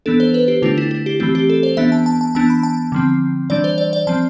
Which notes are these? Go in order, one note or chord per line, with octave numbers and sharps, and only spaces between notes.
E3 B3 D4 A4
C5
B4
G4
D3 A3 D4 F4
E4
E4
G4
E3 A3 C4 G4
G4
A4
C5
E3 B3 D4 E5
A5
A5
A5
E3 B3 D4 A5
B5
A5
D3 F3 C4
E3 G3 D4 D5
C5
D5
D5
F3 C4 A5